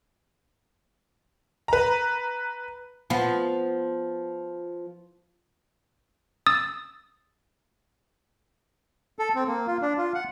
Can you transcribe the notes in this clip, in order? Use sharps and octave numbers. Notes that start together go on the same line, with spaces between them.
B4 A#5
F3 B3
D#6 E6 A6
A4
C4
A#3
F4
D4
F4
F#5